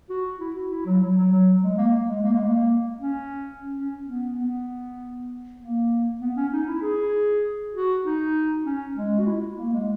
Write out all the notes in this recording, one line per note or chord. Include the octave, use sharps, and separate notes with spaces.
F#4
E4
F#4
E4
F#3
F#3
F#3
F#3
G#3
A#3
G#3
A#3
G#3
A#3
C#4
C#4
B3
B3
A#3
B3
C#4
D#4
E4
G#4
F#4
D#4
C#4
G#3
F#4
E4
A#3
G#3